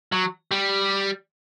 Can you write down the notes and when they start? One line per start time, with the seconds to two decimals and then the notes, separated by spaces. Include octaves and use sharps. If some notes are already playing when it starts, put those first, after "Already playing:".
0.12 F#3
0.51 G3